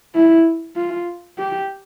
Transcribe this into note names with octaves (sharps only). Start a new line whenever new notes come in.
E4
F4
G4